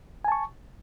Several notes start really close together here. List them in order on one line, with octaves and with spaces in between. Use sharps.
G#5 A5 C#6